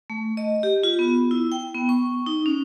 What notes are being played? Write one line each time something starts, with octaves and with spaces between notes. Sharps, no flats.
A3
D#5
G4
F4
B3
E4
G5
B3
C#6
D#4
C#4